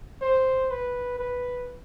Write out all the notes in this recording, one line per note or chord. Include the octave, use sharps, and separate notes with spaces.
C5
B4
B4